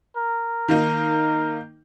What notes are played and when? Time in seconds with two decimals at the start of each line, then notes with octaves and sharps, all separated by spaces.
0.17 A#4
0.68 D#3 A#3 D#4